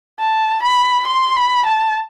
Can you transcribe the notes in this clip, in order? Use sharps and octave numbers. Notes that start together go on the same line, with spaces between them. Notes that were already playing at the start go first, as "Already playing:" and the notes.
A5
B5
C6
B5
A5